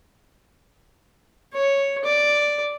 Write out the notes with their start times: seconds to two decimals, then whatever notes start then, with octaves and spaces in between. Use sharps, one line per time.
1.54 C#5
2.04 D5